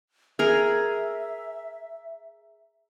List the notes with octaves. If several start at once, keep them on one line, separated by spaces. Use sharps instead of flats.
G#4 A#4 E5